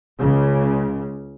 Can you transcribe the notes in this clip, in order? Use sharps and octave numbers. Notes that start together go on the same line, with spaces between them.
C#2 C#3